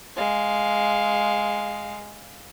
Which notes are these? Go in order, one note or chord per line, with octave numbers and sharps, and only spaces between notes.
G#3 F5